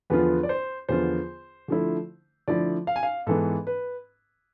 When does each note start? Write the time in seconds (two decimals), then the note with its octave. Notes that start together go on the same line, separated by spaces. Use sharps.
0.10 E2 D3 F3 B3 F4 B4
0.43 D5
0.49 C5
0.89 E2 D3 F3 B3 F4 C5
1.68 D3 F3 A3 E4
2.48 D3 F3 A3 E4 D5
2.87 F5
2.96 G#5
3.03 F5
3.27 G#2 E3 B3 A4
3.67 B4